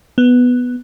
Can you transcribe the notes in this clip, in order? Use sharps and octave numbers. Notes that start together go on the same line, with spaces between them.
B3